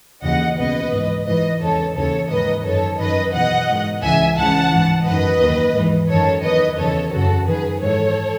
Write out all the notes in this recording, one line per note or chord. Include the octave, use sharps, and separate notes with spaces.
D#2 C#3 E3 D#5 F#5
C#2 B2 B4 D#5
G#2 E3
G#2 E3 B4 D#5
E2 C#3 E3 A4 C#5
D#2 C#3 E3 A4 C#5
G#2 D#3 B4 D#5
F#2 D#3 A4 C#5
F#2 D#3 B4 D#5
E2 B2 D#5 F#5
G#2 D#3
C#2 C#3 E3 E5 G#5
C#2 C#3 E3 F#5 A5
G#2 E3
F#2 B4 D#5
D#3
D#2 D#3
G#2 E3
F#2 D#3 A4 C#5
E2 D#3 B4 D#5
E2 C#3 E3 A4 C#5
F#2 C#3 E3 F#4 A4
F#2 D#3 G#4 B4
G#2 E3 A4 C#5